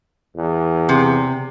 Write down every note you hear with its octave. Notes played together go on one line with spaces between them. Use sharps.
E2
C3